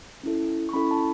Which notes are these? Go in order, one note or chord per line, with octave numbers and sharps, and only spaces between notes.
C#4 E4 A4
C#6
C#4 E4 A4 B5
A5